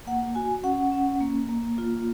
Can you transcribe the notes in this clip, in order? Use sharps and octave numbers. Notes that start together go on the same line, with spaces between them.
A#3 F#5
F#4 G#5
C#4 F#5
C#4
A#3
A#3
F4